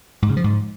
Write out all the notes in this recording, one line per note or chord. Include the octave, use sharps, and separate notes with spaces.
G#2
C#3
F3
G#2